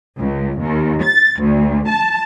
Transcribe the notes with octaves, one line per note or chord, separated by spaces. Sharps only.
C#2
D#2
A6
D2
A5